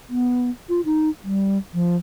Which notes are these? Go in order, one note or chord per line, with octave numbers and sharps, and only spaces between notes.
B3
F4
D#4
G3
F3